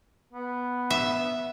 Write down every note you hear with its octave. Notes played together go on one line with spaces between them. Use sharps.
B3
E5